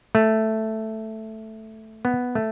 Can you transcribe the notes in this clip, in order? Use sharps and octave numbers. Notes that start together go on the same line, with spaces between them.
A3
B3
A3